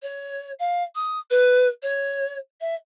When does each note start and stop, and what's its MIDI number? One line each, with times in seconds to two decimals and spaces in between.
0.02 0.51 73
0.59 0.83 77
0.95 1.18 87
1.30 1.68 71
1.82 2.36 73
2.60 2.75 76